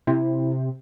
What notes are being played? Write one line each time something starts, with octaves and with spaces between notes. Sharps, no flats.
C3 E4